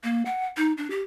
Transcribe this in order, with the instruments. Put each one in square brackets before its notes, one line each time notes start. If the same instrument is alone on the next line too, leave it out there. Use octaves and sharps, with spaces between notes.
[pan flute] A#3
F#5
D#4
D4
G4